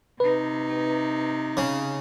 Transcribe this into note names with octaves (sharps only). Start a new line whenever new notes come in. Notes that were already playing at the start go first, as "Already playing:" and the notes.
C3 D#4 B4
C#3